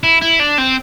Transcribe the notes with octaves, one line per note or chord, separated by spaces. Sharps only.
E4
E4
D4
C4